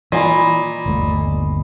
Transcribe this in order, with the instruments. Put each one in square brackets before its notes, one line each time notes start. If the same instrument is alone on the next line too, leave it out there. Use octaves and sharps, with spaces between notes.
[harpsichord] A#2 [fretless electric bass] E3 [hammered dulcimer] D#5 G#5 B5
[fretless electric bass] G1 D#2 A3